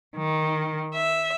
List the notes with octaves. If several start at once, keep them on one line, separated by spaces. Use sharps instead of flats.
D#3
E5